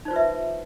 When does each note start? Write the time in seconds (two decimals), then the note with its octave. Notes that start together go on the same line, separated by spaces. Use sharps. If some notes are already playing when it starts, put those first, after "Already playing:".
0.05 D#4
0.08 C5
0.11 F4
0.13 B4
0.16 E5